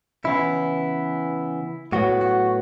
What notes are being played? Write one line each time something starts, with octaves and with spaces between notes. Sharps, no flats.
C#3 E3 B3 E4
A2 F#3 B3 F#4
F#4